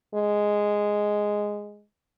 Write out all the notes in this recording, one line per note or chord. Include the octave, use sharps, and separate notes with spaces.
G#3